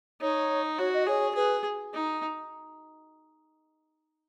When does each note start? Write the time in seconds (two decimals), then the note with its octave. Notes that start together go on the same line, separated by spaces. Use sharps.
0.21 D#4 C#5
0.78 F#4 C#5
0.93 D#5
1.07 G#4 C#5
1.35 G#4 B4
1.93 D#4